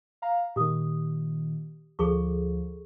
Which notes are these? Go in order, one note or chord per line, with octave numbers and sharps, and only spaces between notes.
F5 A#5
A#2 D#3 G4 D#6
D2 F3 G#4 A4 C#6